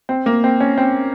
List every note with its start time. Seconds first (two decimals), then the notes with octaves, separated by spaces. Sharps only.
0.09 C4
0.26 A#3
0.44 C4
0.60 C#4
0.78 C4